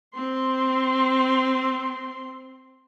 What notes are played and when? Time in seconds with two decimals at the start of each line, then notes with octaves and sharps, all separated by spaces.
0.15 C4 C6